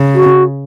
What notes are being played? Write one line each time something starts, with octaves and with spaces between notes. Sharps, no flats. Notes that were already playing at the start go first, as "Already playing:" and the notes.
Already playing: C#3
F#4